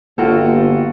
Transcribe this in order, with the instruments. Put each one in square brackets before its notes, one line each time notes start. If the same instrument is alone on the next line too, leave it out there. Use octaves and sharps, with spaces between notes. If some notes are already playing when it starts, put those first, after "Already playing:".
[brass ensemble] G1 [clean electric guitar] A#3 G5 [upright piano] F4 F#4 A4